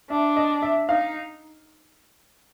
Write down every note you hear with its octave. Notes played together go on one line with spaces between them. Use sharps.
D4 E5
D#5
E5
D#4 F5